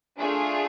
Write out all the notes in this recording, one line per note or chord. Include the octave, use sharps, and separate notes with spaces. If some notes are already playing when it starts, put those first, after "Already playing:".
A3 D4 F4 G#4